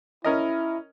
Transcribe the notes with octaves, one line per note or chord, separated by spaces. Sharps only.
C#4 E4 A#4 D#5